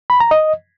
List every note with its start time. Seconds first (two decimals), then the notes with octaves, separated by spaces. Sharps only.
0.10 B5
0.20 A#5
0.31 D#5